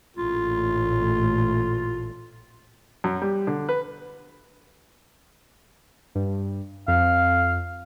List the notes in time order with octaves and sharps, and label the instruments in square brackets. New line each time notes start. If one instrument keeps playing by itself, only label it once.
[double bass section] A1 A#2 A3 [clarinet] F4
[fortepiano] F#2
G3
D3
B4
[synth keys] G2
[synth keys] F2 [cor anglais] F5